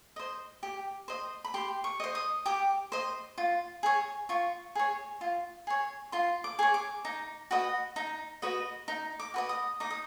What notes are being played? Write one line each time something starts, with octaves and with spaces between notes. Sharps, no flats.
C5 D#5
G4
C5 D#5
B5
G4 C6
C#6
C5 D#5
D#6
G4 D6
C5 D#5
F4
G#4 C#5
F4 C#6
G#4 C#5
F4
G#4 C#5
F4 C6
D6
G#4 C#5
D6
D#4
F#4 B4 D#5
D#4
F#4 B4 D#5
D#4
D6
F#4 B4 D#5
D#6
D#4 D6
D#6